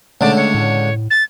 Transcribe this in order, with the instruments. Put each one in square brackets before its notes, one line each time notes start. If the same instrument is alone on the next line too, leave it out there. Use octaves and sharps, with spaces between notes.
[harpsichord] C#2 D3 [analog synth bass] A3 [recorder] D5
[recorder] C#5
[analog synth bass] A2
[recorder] A6